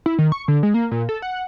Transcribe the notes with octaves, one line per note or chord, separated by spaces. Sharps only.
E4
D#3
C#6
D3
G#3
A#3
A#2
A4
F#5